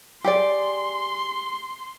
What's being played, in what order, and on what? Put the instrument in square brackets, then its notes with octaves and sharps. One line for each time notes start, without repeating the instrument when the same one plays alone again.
[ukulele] G4 G#4 D5 [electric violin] C6